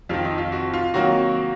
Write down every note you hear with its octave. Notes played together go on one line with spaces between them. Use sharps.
F2 C3 D#3 F4
D#4
F4
F#4
F4
C3 D#3 F#3 A#3 F#4